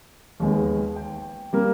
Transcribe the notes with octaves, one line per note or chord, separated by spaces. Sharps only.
D#2 D#3 G#3 B3
G5
G3 A#3